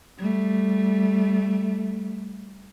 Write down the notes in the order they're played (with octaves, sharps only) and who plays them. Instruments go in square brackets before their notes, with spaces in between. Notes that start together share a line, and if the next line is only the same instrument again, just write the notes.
[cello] G3 A3